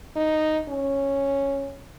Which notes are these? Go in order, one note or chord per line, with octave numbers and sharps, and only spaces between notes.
D#4
C#4